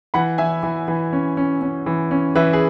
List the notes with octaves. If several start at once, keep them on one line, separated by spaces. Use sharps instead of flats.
E3 F#5 B5
E3 E5 G#5
E3
E3
C#4
C#4
C#4
E3
C#4
E3 B4 E5
G#4